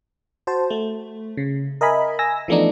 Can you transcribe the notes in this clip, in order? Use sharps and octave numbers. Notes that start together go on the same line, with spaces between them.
F#4 C5 A5
A3
C#3
A#4 D#5 E5 G#5 B5
G#5 E6 A#6
E3 F3 A3 B3 D4 D#4